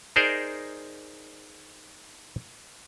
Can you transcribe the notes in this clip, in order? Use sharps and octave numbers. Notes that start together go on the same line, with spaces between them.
D#4 G#4 A#4 C5 D5